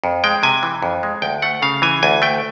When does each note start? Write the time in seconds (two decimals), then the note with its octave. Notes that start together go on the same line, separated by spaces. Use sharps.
0.04 F2
0.24 G#3 G5
0.43 C3 G#5
0.63 E3
0.82 F2
1.03 G#3
1.22 D2 G5
1.42 A3 F#5
1.62 C#3 F5
1.82 E3 G#5
2.03 D2 G#5
2.22 A3 G5